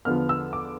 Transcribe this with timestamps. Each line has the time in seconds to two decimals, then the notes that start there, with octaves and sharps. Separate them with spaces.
0.05 E2 D3 F3 B3 F6
0.29 E6
0.53 D6